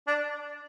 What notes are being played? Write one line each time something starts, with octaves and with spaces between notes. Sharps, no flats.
D4